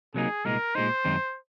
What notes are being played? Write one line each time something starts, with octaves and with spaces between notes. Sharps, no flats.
C3 F#3 A#3 D#4 G#4
C2 A#2 G#3 D#4 A#4
A#2 G#3 D#4 C5
F#2 D#3 G#3 C4 D#4